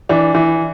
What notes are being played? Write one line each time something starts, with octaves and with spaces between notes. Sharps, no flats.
E3 D4
E3